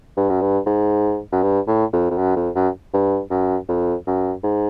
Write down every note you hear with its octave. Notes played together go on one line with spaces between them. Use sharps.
G2
F#2
G2
G#2
F#2
G2
A2
F2
F2
F#2
F2
F#2
G2
F#2
F2
F#2
G#2